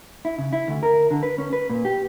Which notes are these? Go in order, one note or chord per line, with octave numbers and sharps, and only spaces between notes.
E4
C#3
E4
D2
A#4
D3
B4
C#4
B4
A#2
G4